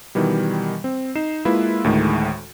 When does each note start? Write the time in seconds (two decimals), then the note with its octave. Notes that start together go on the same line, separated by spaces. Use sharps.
0.15 B2 D#3 E3 G3
0.84 C4
1.15 D#4 C7 E7
1.45 G#3 A#3 E4 F4 B4 E5
1.84 D2 A2 D#3 G#3